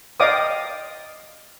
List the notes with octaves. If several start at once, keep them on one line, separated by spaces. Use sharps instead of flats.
D5 D#5 F5 G5 D6 D#6